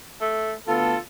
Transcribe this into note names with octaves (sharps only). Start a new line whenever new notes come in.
A3
D2 B3 F4 A4